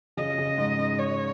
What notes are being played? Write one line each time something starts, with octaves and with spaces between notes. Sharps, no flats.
C#3 D#5
C#3
G#2
G#2
C#5